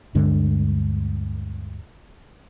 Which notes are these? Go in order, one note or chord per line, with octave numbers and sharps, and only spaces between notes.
D2 G2 D3 G#3